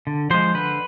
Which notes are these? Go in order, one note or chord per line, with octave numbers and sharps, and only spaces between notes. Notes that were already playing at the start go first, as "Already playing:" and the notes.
D3
F3 G#3 C5
D3 B4